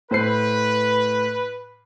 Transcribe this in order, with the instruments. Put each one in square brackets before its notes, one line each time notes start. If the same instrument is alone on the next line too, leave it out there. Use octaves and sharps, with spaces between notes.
[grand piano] A2 C5 C7 [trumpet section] B4